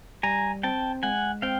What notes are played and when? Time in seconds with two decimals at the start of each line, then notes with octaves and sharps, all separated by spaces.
0.23 G3 G#5 A#5
0.63 C4 G5 A5
1.03 G#3 F#5 G#5
1.42 C4 F5 G5